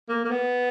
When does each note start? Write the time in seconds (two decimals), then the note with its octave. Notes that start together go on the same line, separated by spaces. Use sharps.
0.09 A#3
0.25 A#3
0.31 B3